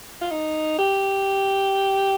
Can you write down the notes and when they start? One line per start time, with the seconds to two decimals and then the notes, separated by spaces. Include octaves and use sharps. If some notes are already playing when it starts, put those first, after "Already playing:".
0.21 F4
0.31 D#4
0.78 G4